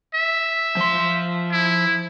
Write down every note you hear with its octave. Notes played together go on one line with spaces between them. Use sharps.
E5
F3 C6
E4